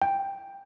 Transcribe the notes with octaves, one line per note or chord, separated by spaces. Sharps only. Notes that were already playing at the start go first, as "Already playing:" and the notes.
G5